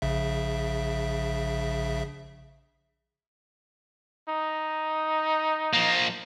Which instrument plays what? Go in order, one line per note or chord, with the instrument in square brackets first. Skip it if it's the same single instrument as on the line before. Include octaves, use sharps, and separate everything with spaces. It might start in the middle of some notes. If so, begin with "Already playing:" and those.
[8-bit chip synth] A#1 C#3 E5
[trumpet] D#4
[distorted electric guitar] F3 A#3